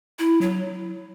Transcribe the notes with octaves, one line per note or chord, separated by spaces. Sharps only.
E4
F#3